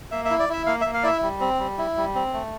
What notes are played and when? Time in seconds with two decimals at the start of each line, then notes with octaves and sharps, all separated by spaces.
0.11 A#3 E5
0.25 E5
0.30 E4
0.39 D5
0.49 E4 E5
0.66 A#3 F5
0.81 A#3 E5
0.94 F5
1.03 E4 D5 E5
1.22 G3
1.40 C4
1.60 G3
1.78 E4
1.97 G3
2.15 C4
2.33 A3